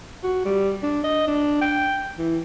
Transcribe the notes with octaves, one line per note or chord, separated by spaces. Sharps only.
F#4
G3
D4
D#5
D4
G5
E3